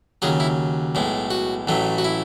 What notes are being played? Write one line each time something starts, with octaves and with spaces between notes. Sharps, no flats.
D#2 C#3 F#3 G#4
E4
B1 A2 G#3
F#4
A1 A2 F#3 A3
F#4
E4